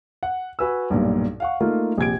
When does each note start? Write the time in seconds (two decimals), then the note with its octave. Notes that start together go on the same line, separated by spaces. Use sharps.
0.23 F#5
0.59 F#4 B4 G#5 E6
0.90 B1 G2 A#2
1.40 F5 F#5 C#6
1.61 A3 A#3 D#4 F4
1.98 A#1 C3 G#6 D7